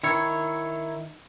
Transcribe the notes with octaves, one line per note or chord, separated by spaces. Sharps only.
D#3 E4 C#5